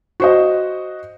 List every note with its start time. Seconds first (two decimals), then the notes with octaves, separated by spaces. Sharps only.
0.20 F#4 C5 D#5